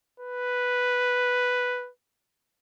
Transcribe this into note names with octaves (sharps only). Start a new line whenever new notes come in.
B4